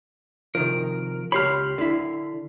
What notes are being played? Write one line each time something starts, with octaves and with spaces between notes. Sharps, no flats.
C3 D#3 F3 A#4
C#2 G4 C#5 B5 C6 F6
D3 E4